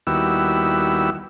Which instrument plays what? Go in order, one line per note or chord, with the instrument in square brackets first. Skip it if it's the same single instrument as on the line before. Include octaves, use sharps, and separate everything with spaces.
[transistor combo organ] D#2 G3 B3 E4 F#4 E6